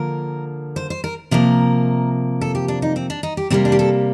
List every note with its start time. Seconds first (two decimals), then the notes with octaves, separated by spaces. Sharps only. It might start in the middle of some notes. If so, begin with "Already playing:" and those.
Already playing: D3 F3 A#3 A#4
0.76 C5
0.90 C5
1.04 A#4
1.31 C3 F3 A#3 A#4
2.41 A4
2.55 G4
2.68 D4
2.82 D#4
2.96 C4
3.10 D4
3.23 D#4
3.37 G4
3.50 C3 G3 A#3 C4
3.65 D4
3.72 G4
3.79 A4